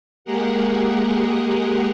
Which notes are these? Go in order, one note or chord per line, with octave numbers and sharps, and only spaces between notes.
G#3 A#3 G4 G#4 A#4 F#5